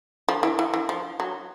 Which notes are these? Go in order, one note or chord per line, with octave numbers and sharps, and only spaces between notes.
F3
E3
E3
E3
F3
F#3